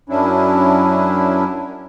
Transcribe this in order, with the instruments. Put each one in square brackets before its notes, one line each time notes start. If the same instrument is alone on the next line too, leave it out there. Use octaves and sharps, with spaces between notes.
[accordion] F#2 F#3 C#4 D4 E4